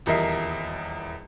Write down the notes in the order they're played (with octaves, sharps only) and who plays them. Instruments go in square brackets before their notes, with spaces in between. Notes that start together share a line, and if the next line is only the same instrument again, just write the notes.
[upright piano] D#1 E2 A#4 D#5 E5 C7